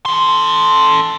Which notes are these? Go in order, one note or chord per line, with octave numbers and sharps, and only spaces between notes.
A4 C6